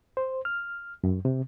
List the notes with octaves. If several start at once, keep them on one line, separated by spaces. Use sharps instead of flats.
C5
F6
F#2
C3